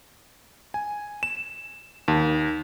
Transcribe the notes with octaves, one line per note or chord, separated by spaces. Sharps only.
G#5
E7
D#2